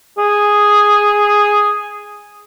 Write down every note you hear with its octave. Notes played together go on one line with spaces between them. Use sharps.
G#4